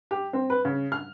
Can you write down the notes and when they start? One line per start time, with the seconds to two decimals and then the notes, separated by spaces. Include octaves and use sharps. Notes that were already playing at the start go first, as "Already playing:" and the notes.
0.11 G4
0.33 C4
0.50 B4
0.65 C#3
0.92 F6